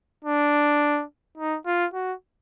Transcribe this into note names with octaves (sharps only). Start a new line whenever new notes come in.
D4
D#4
F4
F#4